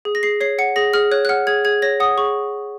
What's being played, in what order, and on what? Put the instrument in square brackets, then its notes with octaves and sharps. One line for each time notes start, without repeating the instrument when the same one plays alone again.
[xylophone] G#4
A#6
G#4 C7
C#5 C7
F#5 C#7
G#4 A#6
G#4 F6
C#5 F#6
F#6
F#5 F6
G#4 G#6
G#4 G#6
C#5 A#6
F#5 D#6
G#4 C#6